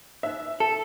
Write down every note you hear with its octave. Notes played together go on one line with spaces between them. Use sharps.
D#4 C5 E5
A4 A5